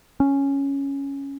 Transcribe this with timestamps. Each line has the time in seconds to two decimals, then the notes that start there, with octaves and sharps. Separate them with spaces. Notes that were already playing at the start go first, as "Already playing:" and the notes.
0.20 C#4